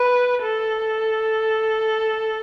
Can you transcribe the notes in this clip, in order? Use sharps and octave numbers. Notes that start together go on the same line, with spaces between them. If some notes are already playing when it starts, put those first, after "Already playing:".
Already playing: B4
A4